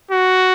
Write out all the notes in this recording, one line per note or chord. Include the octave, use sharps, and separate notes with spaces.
F#4